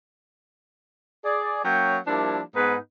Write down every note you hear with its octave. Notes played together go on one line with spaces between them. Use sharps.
G#4 D5
F#3 A#3 C#4 C#5 G5
F3 G3 A#3 D4 E4
G#2 B3 D#4 B4